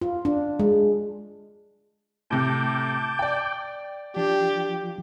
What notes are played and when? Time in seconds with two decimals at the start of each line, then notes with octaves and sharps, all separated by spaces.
0.02 F4
0.25 D4
0.60 G#3
2.31 A2 C3 A5 D6 G6
3.19 D5 G5
4.16 F3 D4 G4